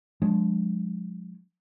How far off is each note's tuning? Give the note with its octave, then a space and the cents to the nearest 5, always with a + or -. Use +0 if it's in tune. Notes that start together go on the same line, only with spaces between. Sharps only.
F3 +45 G#3 +0 D4 -20